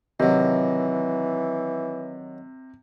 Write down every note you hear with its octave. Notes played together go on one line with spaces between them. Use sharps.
C3 D#3 E3 F#3